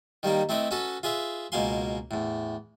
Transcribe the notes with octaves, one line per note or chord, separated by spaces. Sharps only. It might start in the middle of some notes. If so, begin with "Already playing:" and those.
D#3 G3 A#3 D#4
A3 C4 E4 B4 D#5
C#4 F#4 A4 B4
F4 G#4 B4 E5
C#2 B2 A#3 F5 G#5 C6
E2 A2